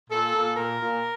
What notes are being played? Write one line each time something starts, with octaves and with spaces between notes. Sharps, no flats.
A#2 A4
A#2
A#2 A#4
A#2